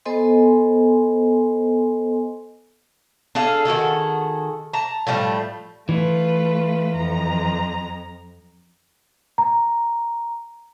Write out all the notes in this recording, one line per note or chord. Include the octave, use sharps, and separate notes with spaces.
B3 A4 C5 D#5 G#5 C6
D4 G#4 A4 F5
D#3 F#4 G#4 A4
A5 A#5
A2 F3 G3 A3
E3 A3 F4 B4
F2 A#5
A#5